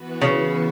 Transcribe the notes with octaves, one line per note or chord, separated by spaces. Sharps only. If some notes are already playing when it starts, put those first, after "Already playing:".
Already playing: E3 B3 F#4 B4
C#3